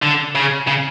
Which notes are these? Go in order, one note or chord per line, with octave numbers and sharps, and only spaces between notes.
D3
C#3
C#3